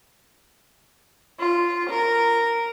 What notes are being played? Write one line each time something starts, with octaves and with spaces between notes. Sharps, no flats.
F4
A#4